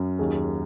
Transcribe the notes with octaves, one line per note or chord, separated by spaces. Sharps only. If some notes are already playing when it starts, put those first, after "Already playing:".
Already playing: F#2
D#2 G#4